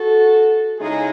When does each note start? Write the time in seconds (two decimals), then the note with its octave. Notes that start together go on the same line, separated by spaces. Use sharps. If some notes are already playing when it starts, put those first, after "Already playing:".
Already playing: F#4 A4
0.78 C#3 G#3 D#4 E4 G#4